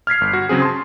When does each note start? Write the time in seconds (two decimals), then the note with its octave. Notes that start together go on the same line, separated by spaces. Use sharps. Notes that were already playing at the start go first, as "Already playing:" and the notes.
0.07 F6 G#6 B6 C7
0.21 G1
0.33 F#4
0.49 C#3 F#3 C4 G#4
0.62 A5 C6